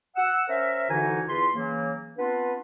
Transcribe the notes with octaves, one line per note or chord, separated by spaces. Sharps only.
F#5 E6
C#4 A#4 C5 E5
C2 D3 E3 D#4 F#4 G#5
E2 F4 B4 C6
C#3 E3 F#3 A#3
B3 C4 D4 F4 B4